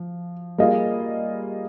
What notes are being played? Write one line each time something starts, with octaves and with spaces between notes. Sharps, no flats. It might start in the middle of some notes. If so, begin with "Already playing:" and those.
Already playing: F3
G3 A#3 F4 G#4 D#5